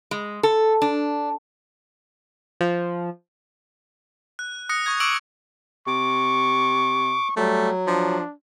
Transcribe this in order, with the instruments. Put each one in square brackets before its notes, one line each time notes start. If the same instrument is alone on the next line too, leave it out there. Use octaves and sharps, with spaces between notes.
[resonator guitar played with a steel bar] G#3
A4
D4
[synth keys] F3
[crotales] F#6
D#6 F#6 A#6 C#7
C#6 D#6 G#6
C#6 D6 E6 D7 F#7
[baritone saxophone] C3 [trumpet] C#6 [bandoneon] D6
[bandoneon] F#3 [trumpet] G3 [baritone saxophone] A3
[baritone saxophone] F3 [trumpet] D4